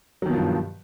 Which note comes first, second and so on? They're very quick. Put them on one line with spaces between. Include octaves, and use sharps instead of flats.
F#3 D#3 B2 F3 G2